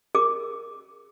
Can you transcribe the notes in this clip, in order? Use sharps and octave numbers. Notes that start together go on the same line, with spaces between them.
G#4 A#4 D6